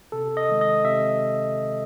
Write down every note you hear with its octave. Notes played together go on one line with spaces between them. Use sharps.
C3 A4
D#5
D#3 G#3
D#5
C3 E5